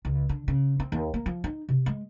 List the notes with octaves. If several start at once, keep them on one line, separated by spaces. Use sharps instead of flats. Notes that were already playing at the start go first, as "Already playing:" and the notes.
C#2
D3
C#3
C4
D#2
A#3
F3
D#4
C3
G#3